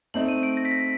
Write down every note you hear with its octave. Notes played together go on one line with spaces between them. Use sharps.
A3 C4 D#4 F#7
D#7
D7
A#6
B6
A#6